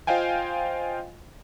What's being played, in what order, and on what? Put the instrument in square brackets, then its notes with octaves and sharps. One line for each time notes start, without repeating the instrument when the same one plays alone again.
[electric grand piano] F4 C5 D#5 F5 G5 G#5